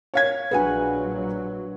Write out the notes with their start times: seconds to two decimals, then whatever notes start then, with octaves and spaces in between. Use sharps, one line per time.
0.14 C#5 F5 G#6
0.51 A#1 F#3 D4 F#4 G#4 B4 F#5 G#5